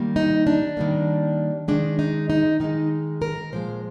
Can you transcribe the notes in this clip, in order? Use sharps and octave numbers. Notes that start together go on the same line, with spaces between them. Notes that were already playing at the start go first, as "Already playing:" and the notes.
Already playing: D#3 G3 A#3
D#4
D4
D#3 G3 A#3
D#3 G#3 D4
D#4
D#4
D#3 G#3 D#4
A#4
A#2 F3 G#3 C5